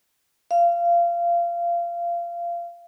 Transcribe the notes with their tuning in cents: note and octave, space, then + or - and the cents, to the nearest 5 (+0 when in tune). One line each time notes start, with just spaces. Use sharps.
F5 -20